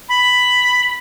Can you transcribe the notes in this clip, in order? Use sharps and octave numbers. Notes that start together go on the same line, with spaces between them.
B5